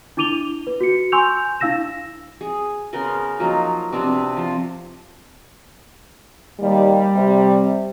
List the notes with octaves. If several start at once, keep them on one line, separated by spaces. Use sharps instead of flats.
D4 E4 D6 D#7 F7 G7
B4
F#4 C#7
G#5 C6 C#6 E6 G6 F7
D4 E4 F5 E6 A#6 E7
G#4
C#3 B3 A#4 C6
F3 F#3 A#3 D#4
C3 B3 C4 D4
F3 C5
D#2 G3
C3